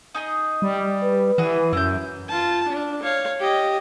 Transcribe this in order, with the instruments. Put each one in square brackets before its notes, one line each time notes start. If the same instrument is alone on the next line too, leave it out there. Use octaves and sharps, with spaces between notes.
[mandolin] D#4 G#4 D#5
[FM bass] G3
[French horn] B4
[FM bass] E3 [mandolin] F#4 G#4
[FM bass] F#2 [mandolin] E4 G6
[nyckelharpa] F4 A5
D4
C#5 F5
G4 D#5